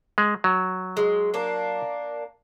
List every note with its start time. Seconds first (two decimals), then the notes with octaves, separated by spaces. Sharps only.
0.18 G#3
0.44 F#3
0.97 G#3
1.34 A#3 D4